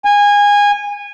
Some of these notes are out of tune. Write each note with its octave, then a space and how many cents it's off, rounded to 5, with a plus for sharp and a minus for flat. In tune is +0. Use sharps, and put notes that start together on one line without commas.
G#5 -20